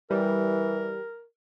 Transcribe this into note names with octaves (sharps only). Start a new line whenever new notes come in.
E3 G3 A#4